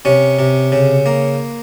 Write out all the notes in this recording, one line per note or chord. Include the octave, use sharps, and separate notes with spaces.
C3 C#4
C3
C#3
A#3